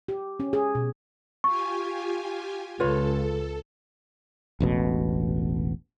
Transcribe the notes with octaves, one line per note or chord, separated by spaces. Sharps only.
G4
C#4
G#4
B2
F4 G4 G#5 C#6
C#2 F4 A4 B4 C#5
E1 A1 B2